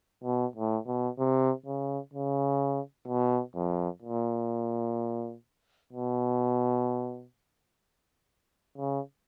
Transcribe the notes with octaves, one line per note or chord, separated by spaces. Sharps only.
B2
A2
B2
C3
C#3
C#3
B2
F2
A#2
B2
C#3